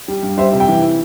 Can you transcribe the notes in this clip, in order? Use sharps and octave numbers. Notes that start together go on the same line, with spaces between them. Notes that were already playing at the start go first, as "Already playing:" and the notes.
G3
G2
G3 C5 E5
C3
E5 G5
E3